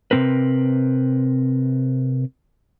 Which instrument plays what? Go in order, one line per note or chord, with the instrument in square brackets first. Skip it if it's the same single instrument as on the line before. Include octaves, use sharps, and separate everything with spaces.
[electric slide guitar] C3 F3 C4 A#4 B4